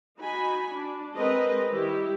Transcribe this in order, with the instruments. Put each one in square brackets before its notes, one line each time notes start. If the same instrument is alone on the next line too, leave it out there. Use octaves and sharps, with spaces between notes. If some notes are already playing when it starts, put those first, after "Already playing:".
[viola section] D#4 F#4 G#5 B5
D4
G#3 C4 A#4 B4 D#5
D#3 G3 E4 G4